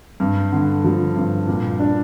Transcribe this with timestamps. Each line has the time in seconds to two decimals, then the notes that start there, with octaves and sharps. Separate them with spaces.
0.20 G2
0.52 D3
0.84 F3
1.16 G2
1.48 A#2
1.79 D4